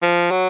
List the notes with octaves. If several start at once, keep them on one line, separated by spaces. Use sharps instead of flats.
F3
F#3